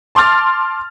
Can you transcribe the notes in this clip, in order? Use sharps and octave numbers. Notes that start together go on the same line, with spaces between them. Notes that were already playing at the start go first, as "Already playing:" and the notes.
A5 C6 D6 F6 A6